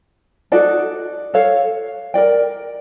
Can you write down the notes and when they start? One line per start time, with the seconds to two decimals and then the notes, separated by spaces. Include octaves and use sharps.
0.52 D#4 F#4 A4 D5
1.34 A4 C#5 F5
2.14 A#4 D5 G5